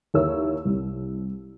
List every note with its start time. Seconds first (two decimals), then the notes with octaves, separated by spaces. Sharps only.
0.14 D#2 E4 A#4 C#5 E6
0.65 C2